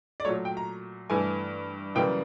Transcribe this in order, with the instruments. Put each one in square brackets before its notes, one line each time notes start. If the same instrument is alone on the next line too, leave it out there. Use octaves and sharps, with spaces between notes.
[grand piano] D5
A#2 F#3 A3 C#5
G5
A#5
G2 E3 A3 G#5
F#2 C#3 E3 G3 A#3 G5